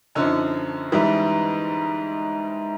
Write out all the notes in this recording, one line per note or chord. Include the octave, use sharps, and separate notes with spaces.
F#2 D3 F3 C#4 D#4
G#2 E3 G3